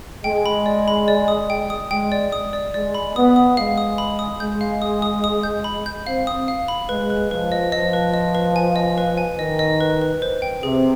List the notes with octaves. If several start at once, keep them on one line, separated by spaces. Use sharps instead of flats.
G#3 G5
B5
D5
B5
D5
D#6
G5
D#6
G#3 G5
D5
D#6
D5
G#3 D5
B5
B3 D#6
D#6
G#3 F5
D#6
B5
D#6
G#3 G6
F5
D#6
D#6
D#6
G6
B5
G6
C4 F5
D#6
F5
B5
G#3 B4
B4
F3 B4
D#5
F3 D#5
B4
D#5
B4
G#5
D#5
B4
G#5
D#3 D#5
D#5
B4
B4
C5
G5
C3 G#4